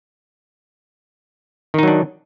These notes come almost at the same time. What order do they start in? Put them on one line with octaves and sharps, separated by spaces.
D#3 D#4 F#3 D4